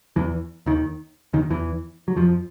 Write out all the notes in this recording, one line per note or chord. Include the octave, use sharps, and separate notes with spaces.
E2 E3
D#2 D#3
D#2 D#3
E2 E3
F#3
F2 F3